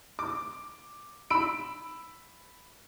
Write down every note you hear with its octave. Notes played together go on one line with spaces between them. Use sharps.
D6
B5 E6 D7